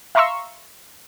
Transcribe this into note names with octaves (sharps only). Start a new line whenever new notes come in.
E5 F5 A#5 C6 C#6 E6